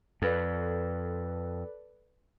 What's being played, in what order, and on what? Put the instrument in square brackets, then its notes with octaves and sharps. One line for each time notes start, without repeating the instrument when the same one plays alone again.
[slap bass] F2 [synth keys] A4 B4 D5